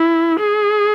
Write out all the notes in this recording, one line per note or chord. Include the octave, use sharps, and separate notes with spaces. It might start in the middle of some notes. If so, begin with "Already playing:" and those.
Already playing: E4
G#4